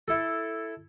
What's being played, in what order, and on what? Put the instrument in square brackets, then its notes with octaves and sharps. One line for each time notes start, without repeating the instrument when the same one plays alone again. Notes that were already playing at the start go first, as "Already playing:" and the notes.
[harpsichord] E4 A4